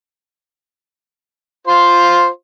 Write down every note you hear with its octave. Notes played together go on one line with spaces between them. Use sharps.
F4 C5 C6